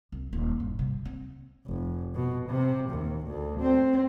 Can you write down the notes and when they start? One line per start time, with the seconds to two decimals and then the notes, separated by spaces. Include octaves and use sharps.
0.12 C2
0.33 D#1
0.60 G2
0.79 C3
1.05 C4
1.66 F1
2.15 B2
2.49 C3
2.90 D#2
3.26 D2
3.61 C4